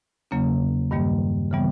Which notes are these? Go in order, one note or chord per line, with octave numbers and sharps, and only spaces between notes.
E2 C#3 F#3 A#3 C#4
G2 D#3 G3 A#3
C#3 E3 G3 B3